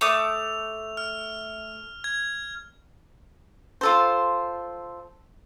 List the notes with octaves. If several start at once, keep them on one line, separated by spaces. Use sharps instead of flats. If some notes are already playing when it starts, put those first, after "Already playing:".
A3 D6 D#6 F7
F6
G#6
F4 A4 C5